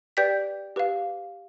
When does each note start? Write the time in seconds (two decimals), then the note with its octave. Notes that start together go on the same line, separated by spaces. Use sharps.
0.17 G4 B4 D5 G5 G6 B6
0.76 G4 B4 F5